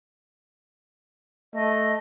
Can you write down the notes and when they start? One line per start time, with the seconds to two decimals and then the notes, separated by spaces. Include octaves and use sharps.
1.54 A3 D#5